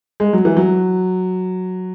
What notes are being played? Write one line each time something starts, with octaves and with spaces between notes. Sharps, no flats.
G#3
F#3
E3
F#3